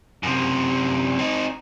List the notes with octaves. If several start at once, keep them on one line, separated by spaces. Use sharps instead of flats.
F#2 C3
C4 D#4